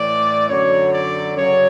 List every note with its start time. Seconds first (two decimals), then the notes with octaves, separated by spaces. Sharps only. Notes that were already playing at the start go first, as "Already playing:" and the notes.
Already playing: A2 E3 D5
0.49 F#2 D3 F#3 C#5
0.93 D5
1.35 F#2 C#3 F#3 C#5